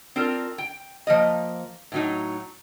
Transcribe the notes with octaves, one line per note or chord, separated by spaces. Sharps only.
C4 D4 F4 A#4
G5
F3 A#3 D#5
A2 F#3 D#4